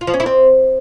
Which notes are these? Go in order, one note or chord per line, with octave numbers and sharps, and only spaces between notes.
F4
F3
C#4
E4
C4